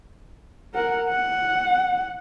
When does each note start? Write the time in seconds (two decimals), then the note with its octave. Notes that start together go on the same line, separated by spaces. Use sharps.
0.74 A#4 F#5
1.10 F#5